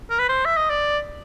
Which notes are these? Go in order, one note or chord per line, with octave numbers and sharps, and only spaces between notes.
A#4
B4
C5
E5
D#5
D5